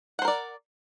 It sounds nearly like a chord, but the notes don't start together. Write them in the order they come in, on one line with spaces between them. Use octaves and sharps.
F#5 C5 A#4 D5